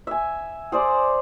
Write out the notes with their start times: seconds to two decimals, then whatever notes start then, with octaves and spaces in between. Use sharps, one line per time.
0.07 E5 G#5
0.72 G#4 C5 D5